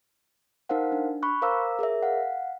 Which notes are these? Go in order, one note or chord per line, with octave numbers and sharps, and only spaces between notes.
D#4 A#4 C5 F5 F#5
D4
B5 C#6 F#6
A#4 C5 F5 A#5 D6 E6
G#4 A#4 C#5 E5
F5 F#5